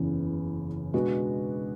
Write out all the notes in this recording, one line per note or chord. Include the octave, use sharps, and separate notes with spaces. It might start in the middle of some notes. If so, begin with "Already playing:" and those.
Already playing: F#1 E2 C#3 E3
B2 G#3 B3 D4 F#4